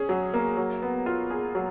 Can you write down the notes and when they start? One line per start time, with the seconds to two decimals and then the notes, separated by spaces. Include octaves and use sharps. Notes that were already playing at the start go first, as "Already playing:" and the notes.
Already playing: C#4 G#4
0.09 F#3
0.34 A#3
0.57 F#3
0.82 B3
1.06 F4
1.30 G#4
1.55 F#3